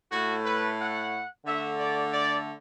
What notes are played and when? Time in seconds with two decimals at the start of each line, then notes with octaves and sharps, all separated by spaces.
0.12 A2 A3 F#4
0.45 B4
0.79 F#5
1.45 D3 A3 E5
1.79 D5
2.12 D5